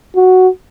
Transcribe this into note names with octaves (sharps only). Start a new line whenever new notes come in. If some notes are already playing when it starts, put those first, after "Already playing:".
F#4